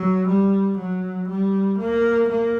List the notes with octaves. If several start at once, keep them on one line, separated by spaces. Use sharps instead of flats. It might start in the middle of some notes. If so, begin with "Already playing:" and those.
Already playing: F#3
G3
F#3
G3
A#3
A#3